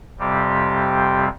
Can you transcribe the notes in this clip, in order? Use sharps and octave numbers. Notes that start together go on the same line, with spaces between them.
F2 C3 G3 C4 G4